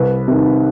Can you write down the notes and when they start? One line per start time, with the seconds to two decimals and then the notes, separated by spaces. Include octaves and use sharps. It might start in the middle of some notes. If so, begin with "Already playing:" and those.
Already playing: C2 B4
0.28 C3 D#3